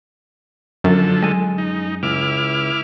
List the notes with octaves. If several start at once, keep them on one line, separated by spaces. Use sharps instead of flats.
F#2 D3 F3 A4
G#3 G#5
D#4
C#2 E4 D6 F6